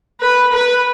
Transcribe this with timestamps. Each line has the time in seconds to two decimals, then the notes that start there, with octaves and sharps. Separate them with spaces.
0.21 B4
0.53 B4